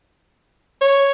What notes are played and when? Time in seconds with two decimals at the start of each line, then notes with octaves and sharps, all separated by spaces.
0.81 C#5